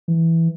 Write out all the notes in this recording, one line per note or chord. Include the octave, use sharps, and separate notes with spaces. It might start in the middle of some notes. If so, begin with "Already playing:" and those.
E3